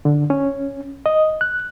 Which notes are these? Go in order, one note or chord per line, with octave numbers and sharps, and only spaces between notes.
D3
C#4
D#5
F#6